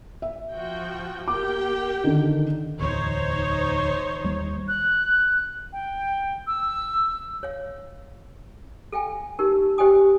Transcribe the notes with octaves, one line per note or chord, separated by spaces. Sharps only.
E5
F3 F#4 G5
A#3 G4 G5 D6
D3 D#3
D1 E2 D#4 C5 C#5
D#2 G3 A#3
F#6
G5
E6
C#5 F5
A4 F5 G5 G#5
D#4 G4 A#4
G4 C5 D#5 G5 G#5 D#6